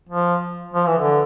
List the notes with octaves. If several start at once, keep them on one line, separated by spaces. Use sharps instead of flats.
F3
F3
E3
D3